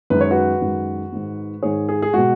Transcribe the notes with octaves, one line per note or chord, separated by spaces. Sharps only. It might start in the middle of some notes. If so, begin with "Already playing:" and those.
F#2 D#3 G#3 B4
C#5
F#4 B4
F#2 D#3 G#3
G#2 D#3 G#3
G#2 D#3 G#3 G#4 C#5
G#4
G#4
B2 G#3 F#4